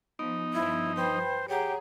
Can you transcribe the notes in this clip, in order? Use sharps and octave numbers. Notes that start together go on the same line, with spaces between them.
F3 B3 D#4
G2 F3 E4
B4 C5 G5 B5
G4 G#4 C#5 F#5 A#5